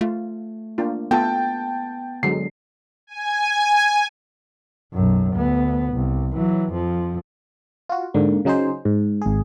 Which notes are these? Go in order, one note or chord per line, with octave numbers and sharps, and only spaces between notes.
A3 F4
A#3 D4 F4
A3 B3 F4 A4 G5 A5
D3 F#3 G#3 C7
G#5
B1 F#2
D2 B3
C2
E3 F#3
F2 F3
F4 F#4
G#2 D3 A#3
C#3 F#3 D#4 G#4 C5
G#2
G#1 G#4